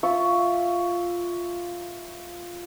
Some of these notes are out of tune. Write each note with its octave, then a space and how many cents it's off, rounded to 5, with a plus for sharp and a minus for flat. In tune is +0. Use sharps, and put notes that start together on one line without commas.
F4 +0 E5 +0 C#6 +10